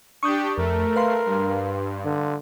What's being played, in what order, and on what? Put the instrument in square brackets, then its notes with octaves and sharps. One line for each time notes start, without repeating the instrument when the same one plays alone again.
[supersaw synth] D4 G4 [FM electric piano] C#6 D#6 G6
[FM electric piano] F2 [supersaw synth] A3 [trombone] A#4
[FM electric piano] B4 F5 C6
[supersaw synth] G2
[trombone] D3